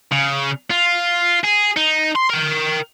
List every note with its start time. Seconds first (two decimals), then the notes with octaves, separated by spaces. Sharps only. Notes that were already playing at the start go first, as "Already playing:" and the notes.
0.12 C#3
0.70 F4
1.44 G#4
1.76 D#4
2.15 C6
2.30 A#4 G5